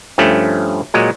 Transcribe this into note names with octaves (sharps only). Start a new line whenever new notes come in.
G2 F3 A3 C#4
A#2 F#3 G#3